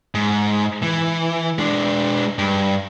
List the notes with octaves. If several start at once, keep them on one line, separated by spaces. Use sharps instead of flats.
G#2
E3
G#3 D4
G2